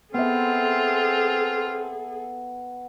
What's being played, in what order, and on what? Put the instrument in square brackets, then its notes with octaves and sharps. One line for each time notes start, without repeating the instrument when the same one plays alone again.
[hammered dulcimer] B3 E5 [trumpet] C4 [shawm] F4 [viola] G#4 A4